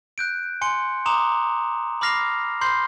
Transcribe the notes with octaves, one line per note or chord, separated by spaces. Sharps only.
F#6 G6 D7
G#5 C6 C#7
A#5 C6 D6 D#6 E7 F7
B5 D6 F6 A#6 C7 F7
B5 C6 G6 C7